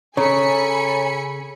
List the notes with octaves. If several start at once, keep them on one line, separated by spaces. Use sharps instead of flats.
C#3 A4 C#5 G#5 A#5 B5 C#7